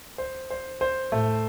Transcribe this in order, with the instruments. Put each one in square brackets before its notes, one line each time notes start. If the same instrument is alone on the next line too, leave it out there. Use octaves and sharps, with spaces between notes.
[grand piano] C5
C5
C5
[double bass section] A2 [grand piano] A3